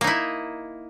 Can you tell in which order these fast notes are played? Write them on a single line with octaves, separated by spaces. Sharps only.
A#3 D#4 E4